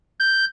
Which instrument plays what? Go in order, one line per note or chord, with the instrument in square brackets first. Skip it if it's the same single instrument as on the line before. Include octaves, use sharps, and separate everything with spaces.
[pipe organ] G6